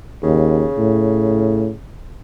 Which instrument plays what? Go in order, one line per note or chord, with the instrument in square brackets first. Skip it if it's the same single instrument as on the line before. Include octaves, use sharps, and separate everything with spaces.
[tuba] D#2 [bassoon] C#3
[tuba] A2